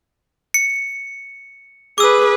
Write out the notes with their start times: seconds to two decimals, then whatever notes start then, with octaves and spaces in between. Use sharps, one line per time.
0.54 C#7
1.98 G#4 B4 D6 E6